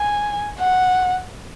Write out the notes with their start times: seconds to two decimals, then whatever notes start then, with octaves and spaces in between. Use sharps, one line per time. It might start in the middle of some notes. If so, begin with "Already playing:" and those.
Already playing: G#5
0.59 F#5